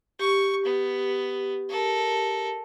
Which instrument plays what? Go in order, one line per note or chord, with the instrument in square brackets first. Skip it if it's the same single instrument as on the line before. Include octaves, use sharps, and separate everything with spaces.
[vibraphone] G4 [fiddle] C#6
[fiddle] B3
A4 A#4